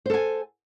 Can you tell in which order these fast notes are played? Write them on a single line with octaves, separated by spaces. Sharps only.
C5 A4 G#5